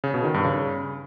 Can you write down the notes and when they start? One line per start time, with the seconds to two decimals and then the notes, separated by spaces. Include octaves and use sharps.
0.04 C#3
0.14 B2
0.24 D#3
0.34 G2
0.45 C#3